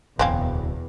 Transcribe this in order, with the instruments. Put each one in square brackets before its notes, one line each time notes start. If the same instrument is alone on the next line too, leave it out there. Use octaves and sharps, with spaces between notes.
[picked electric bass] D1 G#1 [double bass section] E2 B2 [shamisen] C4 C#4 F5